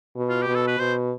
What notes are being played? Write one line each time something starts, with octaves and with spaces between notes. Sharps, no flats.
B2
F4
G4
B2
A4
B4
B2 C5